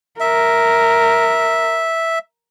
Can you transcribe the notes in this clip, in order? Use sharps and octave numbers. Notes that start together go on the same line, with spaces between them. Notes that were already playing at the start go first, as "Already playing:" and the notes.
A#4 E5